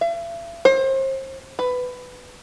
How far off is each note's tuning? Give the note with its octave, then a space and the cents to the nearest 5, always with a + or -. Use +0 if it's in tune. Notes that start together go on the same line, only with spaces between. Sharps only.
E5 +45
C5 +35
B4 +15